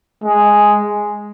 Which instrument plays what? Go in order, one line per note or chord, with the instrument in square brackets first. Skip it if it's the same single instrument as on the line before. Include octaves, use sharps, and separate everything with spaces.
[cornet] G#3